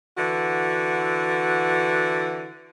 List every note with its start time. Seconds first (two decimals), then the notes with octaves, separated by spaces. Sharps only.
0.18 D3 E3 F#4